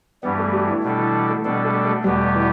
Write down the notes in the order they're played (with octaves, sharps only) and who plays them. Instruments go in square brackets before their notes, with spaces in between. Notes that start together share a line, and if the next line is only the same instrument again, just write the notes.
[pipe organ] G2 E3 G3 [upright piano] B3
[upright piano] A3
G4
E4
[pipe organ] B2 G3 D4 A4
[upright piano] E3
A3
[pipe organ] B2 G3 D4 A4 [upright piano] B3
[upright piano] A3
A3
[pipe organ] E2 B2 B3 G4 [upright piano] G3
[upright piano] E3